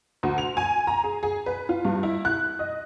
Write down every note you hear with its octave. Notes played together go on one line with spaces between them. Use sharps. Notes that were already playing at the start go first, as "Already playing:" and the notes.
D2
F7
G#5
A#5
G#4
G#4
B4
F4
G2
E4
F#6
D#5